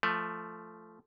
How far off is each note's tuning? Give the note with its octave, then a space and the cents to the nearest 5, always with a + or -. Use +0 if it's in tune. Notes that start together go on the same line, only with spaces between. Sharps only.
F3 -15 A3 +0